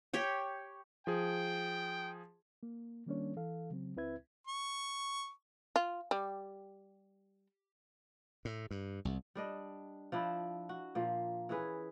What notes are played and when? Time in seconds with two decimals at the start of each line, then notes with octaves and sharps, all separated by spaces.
0.14 G4 C#5 G5
1.07 F3 G#4 G5
2.63 A#3
3.06 D#3 G3 A#3 C#4 D4 C#5
3.36 E3 A4 F5
3.70 C#3 F#3 C4
3.96 C#2 C4 E4 B4 E5 G#6
4.47 C#6
5.76 F4
6.11 G3
8.45 A2
8.71 G2
9.05 C2
9.35 G3 D4 D#5
10.12 F3 D4 E4
10.69 F#4
10.95 A#2 F3 A#3
11.49 E3 C#4 G#4 B4